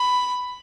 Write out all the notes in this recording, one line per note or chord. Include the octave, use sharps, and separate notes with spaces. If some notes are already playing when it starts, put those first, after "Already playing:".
Already playing: B5